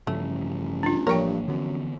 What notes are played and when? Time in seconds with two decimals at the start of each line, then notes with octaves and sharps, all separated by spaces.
0.07 A1 G2 C#3 F3 A3
0.83 D4 F4
1.07 A1 G2 F3 A#3 A#4 C#5 G5
1.48 F#2 D3 E3 B3